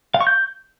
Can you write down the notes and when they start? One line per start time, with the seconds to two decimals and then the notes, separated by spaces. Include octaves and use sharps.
0.14 F5
0.21 C#6
0.27 G6